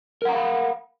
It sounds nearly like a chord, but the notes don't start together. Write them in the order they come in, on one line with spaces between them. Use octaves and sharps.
A#4 F#5 A#5 F5 B5